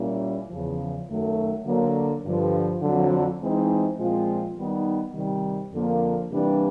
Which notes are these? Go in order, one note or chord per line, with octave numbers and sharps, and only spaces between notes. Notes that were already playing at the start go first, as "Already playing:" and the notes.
Already playing: A#2 G3 A#3 C#4 E4
E2 C#3 F3
F#2 D#3 F#3 A3
D3 F#3 A#3
G2 D3 F3
F2 D3 F#3
E3 G#3 C4 D#4
A#2 F3 G#3 C4 F4
D#3 G3 B3 D#4
C3 D#3 G3
F2 D3 F3 A#3
C3 E3 G3 A#3 D4